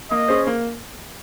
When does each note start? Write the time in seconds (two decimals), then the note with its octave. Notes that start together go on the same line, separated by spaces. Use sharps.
0.11 A#3 D#5
0.28 C#4 G#4 C5
0.47 A#3